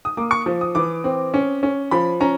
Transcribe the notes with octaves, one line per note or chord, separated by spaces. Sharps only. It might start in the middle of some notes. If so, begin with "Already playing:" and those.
D#6
A#3 D6
C#6
F3
D#6
E3 D6
C4
C#4
C#4
F3 B5
C#4 A#5